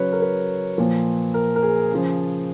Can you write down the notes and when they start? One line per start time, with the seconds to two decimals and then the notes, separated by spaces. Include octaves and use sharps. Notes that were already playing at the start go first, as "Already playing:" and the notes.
Already playing: C#3 F#3 B4 C#5
0.12 A#4
0.22 B4
0.78 A#2 F3
1.34 A#4
1.56 A#4
1.63 G#4
1.91 C#3 F3